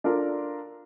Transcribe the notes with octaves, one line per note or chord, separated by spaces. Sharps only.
D4 F4 A4 A#4